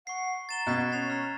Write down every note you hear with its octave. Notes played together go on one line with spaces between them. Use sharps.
F#5 C#6 C7
A#5 A6 E7 G7
B2 F#6 G#6 B6
C#4 A6 C7 F7
A#5 F6